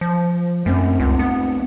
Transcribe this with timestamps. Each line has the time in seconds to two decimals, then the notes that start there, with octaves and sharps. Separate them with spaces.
0.01 F3
0.66 F#2 A3 C4
1.00 C#2
1.19 B3